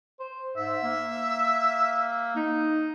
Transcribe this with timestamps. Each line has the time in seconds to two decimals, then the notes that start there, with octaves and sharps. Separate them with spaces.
0.20 C5
0.57 G#2 E5
0.83 A#3
2.36 D#4